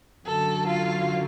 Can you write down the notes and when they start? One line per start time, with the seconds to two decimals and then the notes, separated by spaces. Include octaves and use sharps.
0.24 F#2 D3 F#3 A4
0.66 F4